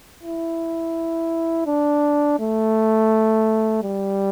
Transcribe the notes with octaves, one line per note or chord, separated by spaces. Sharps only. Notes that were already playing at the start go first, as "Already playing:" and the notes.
E4
D4
A3
G3